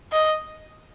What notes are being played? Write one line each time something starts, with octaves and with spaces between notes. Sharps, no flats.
D#5